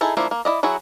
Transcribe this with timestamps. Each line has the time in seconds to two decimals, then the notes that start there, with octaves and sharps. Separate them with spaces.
0.01 D#4 E4 G#4 A4
0.17 F3 A#3 D4 E4
0.31 A#3
0.45 E4 D5 D#5
0.63 F#3 E4 F#4 G#4